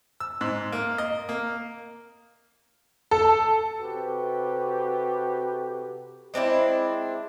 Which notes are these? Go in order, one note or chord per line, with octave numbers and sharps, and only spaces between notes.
E6
G#2
A#3
D#5
A#3
A4
C3 F#4 G4 A4 B4
G#3 C4 D4 E4